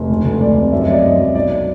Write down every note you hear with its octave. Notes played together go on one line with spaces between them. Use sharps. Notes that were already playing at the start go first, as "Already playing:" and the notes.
Already playing: F1
D2
D2
D2 D5
C3
F#2 E5
D#5
F#3 D5
F#2 D#5
F#2
B1 D5